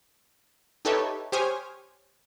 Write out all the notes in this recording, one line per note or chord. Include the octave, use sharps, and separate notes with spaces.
D#4 G4 A4 B4 C#5 E5
G4 C5 C#5 G#5 D#6 F6